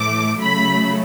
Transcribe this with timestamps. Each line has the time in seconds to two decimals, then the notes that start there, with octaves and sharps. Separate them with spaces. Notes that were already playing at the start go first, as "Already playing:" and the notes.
Already playing: A2 E3 A3 D6
0.40 C#3 F#3 A3 B5